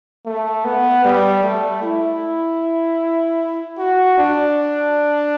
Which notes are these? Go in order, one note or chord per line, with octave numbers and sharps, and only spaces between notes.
A3
B3
G3
A3
E4
F#4
D4